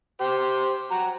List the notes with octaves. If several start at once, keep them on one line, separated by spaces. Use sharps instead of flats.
G4 C5
F#4 A#5